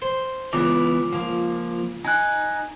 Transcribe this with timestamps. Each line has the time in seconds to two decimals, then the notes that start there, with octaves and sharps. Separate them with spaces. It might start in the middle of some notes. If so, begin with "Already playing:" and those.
0.02 C5
0.53 C#2 E3 B3 A#5 D6
1.13 F3 A#3
2.05 D#4 G#5 F#6